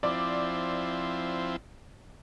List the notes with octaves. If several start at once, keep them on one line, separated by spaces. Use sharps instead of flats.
F3 C4 E4 D5